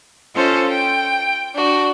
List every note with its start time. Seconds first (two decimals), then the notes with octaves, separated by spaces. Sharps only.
0.35 C#4 F4 A4 C5 D#5 F5
0.69 G5
1.55 D4 F#4